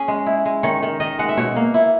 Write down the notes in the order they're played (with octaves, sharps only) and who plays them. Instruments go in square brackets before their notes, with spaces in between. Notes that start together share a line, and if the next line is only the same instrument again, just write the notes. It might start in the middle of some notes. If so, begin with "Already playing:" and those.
Already playing: [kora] C#4 G#4
G#3
E4
G#3
D#3 C#5
D#3
D#3 D#5
G#3 F#5
E5
B2 C#5
A#3
E4